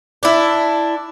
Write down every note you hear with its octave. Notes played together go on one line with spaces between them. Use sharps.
D4 E4